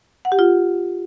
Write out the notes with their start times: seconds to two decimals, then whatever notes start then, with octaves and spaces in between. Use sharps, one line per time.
0.25 F#5
0.32 G4
0.39 F4